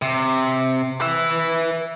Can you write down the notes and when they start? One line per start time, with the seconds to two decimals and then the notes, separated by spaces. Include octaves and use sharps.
0.02 C3
1.01 B4 E5